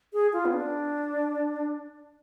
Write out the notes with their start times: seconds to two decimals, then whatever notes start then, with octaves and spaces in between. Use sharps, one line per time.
0.13 G#4
0.33 F4
0.45 B3
0.53 D4